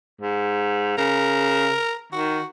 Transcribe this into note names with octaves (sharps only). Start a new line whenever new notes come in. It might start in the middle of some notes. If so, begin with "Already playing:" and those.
G#2
C#3 A#4
D#3 F#4